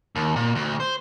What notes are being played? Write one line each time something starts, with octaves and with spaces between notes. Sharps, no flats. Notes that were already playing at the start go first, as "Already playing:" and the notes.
D#2
A#2
D2
C5